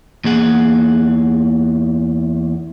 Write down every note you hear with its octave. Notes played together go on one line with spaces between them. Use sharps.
E2 A#3 G#4 F#5